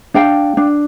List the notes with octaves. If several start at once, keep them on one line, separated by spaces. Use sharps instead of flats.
D4 F5 G5
D4